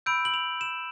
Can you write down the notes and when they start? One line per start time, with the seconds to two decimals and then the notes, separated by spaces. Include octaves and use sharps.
0.06 B5 E6 G6 D7
0.25 F#7
0.34 F7
0.61 E7